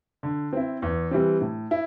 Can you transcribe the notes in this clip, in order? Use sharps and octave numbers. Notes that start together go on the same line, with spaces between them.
D3
C4 E4
E2
E3 G3 C4
A2
E4